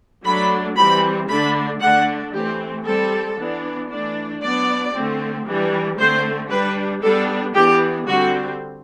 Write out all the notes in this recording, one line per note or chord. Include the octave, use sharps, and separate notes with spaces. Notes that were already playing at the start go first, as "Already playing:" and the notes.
F#3 A3 D4 B5
E3 G3 C4 B5
D3 A3 D4 B5
D3 A3 D4 F#5
E3 A3 C4 G4
G3 C4 A4
E3 B3 D4
E3 A3 D4
F#3 B3 D4 D5
D3 A3 C4
E3 G3 D4
D3 A3 C4 C5
G3 D4 B4
G3 B3 D4 A4
E3 B3 D4 G4
D3 G3 C4 F#4